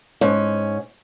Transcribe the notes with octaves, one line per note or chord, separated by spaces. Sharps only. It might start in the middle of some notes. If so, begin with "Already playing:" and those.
G#2 C#4